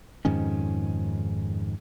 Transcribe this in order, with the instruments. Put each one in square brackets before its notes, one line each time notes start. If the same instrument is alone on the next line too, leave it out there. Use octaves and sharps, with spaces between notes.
[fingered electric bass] F2 G#2 D#3 C#4